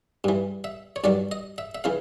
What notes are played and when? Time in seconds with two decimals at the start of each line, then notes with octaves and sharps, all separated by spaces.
0.24 G2 E3
0.64 E5
0.96 C#5
1.04 G2 D#3 F#3 D5
1.31 D#5
1.58 E5
1.75 E5
1.84 C#3 E3 F5